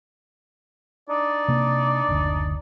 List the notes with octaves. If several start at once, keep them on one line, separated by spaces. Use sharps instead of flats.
D4 D#4 D5
C3 A#3
F#1 D2